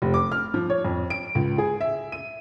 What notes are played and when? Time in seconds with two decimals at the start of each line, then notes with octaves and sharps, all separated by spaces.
0.02 F1
0.14 D6
0.32 F6
0.54 F3
0.70 C#5
0.85 F2
1.10 D7
1.35 C#2
1.58 G#4
1.81 E5
2.12 D#7